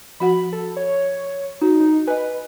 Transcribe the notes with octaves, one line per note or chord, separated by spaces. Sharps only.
F3 F#4 F#5 B5
A4
C#5
D#4 F#4
D#4
B4 D#5 G#5